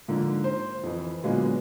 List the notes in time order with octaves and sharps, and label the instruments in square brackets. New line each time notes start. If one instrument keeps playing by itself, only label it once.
[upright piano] G#2 D3 F3 A#3
C5
F2 E3
A#2 D3 F#3 G#3 A#3 B3